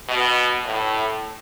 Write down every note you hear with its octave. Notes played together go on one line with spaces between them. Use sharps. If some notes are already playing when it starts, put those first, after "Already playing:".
B2
A2